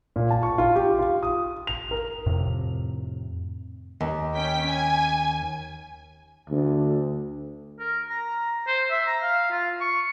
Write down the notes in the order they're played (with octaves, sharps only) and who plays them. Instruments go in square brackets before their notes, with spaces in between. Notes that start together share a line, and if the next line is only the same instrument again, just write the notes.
[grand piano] A#2
A5
C#6
F4
G4
F4
D#6
F7
A#4
[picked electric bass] F2 A2 C3
[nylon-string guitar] D#2
[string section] C#4 G5 B6
G#5
[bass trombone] D2
[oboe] A#4
A#5
C5
E5
A#5
F5
F4
C#6